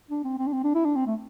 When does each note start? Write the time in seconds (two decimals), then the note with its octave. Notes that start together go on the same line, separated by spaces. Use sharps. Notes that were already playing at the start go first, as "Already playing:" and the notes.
0.11 D4
0.24 C4
0.38 C4
0.47 D4
0.53 C4
0.64 D4
0.75 E4
0.85 D4
0.96 C4
1.07 A3